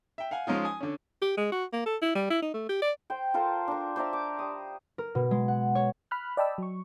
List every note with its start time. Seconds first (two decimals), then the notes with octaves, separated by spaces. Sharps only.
0.18 E5 G5
0.31 F5 F#5 G#5
0.47 F3 G#3 C#4 D#4 F4
0.65 G#5 D#6
0.81 D3 C#4
1.22 G4
1.37 G#3
1.52 F#4
1.73 A#3
1.86 A4
2.02 E4
2.15 G3
2.30 E4
2.42 D#4
2.54 A3
2.69 G4
2.82 D5
3.10 C5 G5
3.34 F4 A4 A#4 C5
3.68 D4 A#4
3.96 C5 D5 E5 A#5
4.13 D6
4.39 G3 D#6
4.98 A#4
5.15 B2
5.31 G#3
5.48 F#5
5.75 C#5
6.11 B5 F6 F#6
6.37 D5 D#5 G5 A5 B5 E6
6.58 F#3 C#6